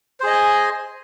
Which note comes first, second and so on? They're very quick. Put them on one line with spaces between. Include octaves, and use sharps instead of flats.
C5 G#4 D#5 G#5